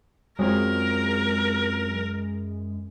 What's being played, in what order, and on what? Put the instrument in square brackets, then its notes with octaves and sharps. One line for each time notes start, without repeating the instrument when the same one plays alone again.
[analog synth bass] F#2 [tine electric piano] F#3 C4 F4 [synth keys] G#3 [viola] A#4